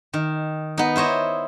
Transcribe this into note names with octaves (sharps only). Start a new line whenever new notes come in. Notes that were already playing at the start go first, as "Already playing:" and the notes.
D#3
B3 D#4
E4 C5 C#5 D#5